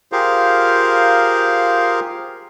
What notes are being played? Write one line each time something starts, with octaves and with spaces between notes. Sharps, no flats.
F4 G4 G#4 A#4 C5 F5